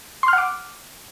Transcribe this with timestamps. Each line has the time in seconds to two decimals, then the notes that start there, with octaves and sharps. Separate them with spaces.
0.23 C6
0.28 F6
0.33 F#5
0.38 D6